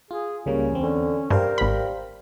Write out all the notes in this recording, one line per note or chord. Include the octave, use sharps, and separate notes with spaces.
F4 G#4
C#2 C#3 G3 A#3 C#4
E2 C4
D3 C#4
G2 G3 A#4 C5 F5 G5
G#1 B5